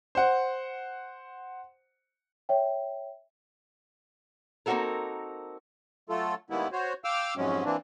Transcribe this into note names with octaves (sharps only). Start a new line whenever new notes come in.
C5 F#5
C#5 E5 G5
A#3 C4 D#4 F#4 A4 A#4
F#3 A3 F4 A4
D#3 G3 G#3 A#3 B3 E4
F#4 C5 C#5
F5 G5 D6 E6 F6
F2 G#2 C3 F#3 G#3 C#4
E3 A#3 C4 D4